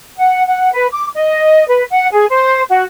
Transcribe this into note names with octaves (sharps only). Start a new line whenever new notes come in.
F#5
F#5
B4
D6
D#5
B4
F#5
G#4
C5
F#4